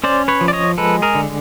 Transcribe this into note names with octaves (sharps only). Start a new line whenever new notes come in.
C#4 C5 D5
B4 C#5
F3
D5
C#5 D#5
G#3 A4 B4
G#4 A#4
D3